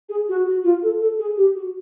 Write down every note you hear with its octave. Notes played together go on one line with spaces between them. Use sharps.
G#4
F#4
F#4
F4
A4
A4
G#4
G4
F#4